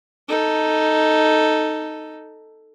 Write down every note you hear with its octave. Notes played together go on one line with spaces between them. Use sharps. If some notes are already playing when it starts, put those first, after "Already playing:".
D#4 A4